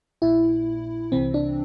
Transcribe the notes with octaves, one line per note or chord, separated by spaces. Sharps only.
A#1 A#2 E4
C2 C3 E3 C4
D4